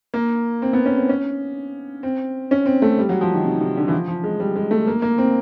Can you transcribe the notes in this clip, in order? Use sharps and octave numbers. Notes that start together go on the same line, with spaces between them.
A#3
C4
B3
C#4
C4
C#4
C4
C#4
C4
A3
G3
F#3
F3
D#3
C3
C3
D3
E3
F3
F3
G#3
G3
G#3
A3
A#3
A#3
C4